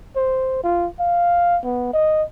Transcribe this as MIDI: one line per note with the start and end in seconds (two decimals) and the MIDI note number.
0.16 0.61 72
0.64 0.87 65
0.99 1.58 77
1.64 1.89 59
1.93 2.23 75